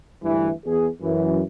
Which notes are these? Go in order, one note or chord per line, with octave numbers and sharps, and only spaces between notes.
D2 G2 E3
E2 G#4
F#2 E3